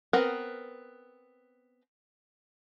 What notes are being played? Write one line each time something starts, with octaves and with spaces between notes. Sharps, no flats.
B3 C4 A#4 B4 F#5